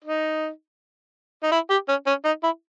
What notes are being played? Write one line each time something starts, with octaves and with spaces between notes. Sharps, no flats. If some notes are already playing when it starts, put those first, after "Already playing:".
D#4
D#4
E4
G4
C#4
C#4
D#4
E4